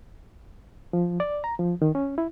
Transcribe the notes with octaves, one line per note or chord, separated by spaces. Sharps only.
F3
D5
A#5
F3
D#3
C#4
E4